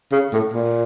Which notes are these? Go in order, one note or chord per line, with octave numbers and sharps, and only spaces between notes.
C#3
A2
A#2